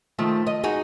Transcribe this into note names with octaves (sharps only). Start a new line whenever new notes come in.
D#3 F3 A3
D#5
D#4 F#4 G#4